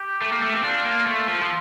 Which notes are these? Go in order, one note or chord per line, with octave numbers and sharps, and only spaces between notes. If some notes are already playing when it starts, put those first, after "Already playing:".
Already playing: G4
A3
A#3
A3
C4
D4 F4
A#3
A3
F3
F3